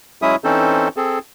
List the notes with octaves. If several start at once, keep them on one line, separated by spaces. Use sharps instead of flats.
F#3 G#3 C#4 E4 E5 D#6
E3 C4 C#4 D#4 A4 C5
C4 G#4 A4